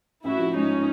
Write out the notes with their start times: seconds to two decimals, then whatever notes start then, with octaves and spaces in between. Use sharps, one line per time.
0.24 A1 E4 F#4
0.39 F3
0.55 G#2 C#4 D#4